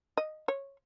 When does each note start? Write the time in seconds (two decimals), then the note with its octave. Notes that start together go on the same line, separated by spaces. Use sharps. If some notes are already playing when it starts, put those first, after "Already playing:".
0.17 D#5
0.48 C#5